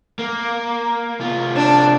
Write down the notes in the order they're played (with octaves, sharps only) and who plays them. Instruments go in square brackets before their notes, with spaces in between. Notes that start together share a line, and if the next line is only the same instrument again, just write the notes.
[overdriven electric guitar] A#3
C2 F4
[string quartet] D4